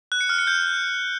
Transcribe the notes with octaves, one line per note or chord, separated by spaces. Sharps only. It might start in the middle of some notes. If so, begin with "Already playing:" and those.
F#6
C#7
F6
C#7
G6